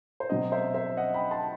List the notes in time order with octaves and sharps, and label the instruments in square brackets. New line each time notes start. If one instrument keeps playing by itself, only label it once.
[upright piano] C5
B2 F#3 C4 D#5
C5 E5
C5 E5
D#5 F#5
G5 B5
A5 C6